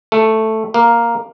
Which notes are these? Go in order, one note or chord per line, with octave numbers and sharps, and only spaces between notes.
A3
A#3